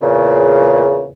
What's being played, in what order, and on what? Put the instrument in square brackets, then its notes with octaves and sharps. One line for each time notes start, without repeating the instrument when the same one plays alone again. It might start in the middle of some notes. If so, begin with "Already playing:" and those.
[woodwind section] E2 A#2 C#3